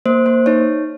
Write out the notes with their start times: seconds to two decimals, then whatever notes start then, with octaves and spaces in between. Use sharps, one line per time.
0.06 A#3 C5
0.26 A#3 C5
0.46 D#4 C#5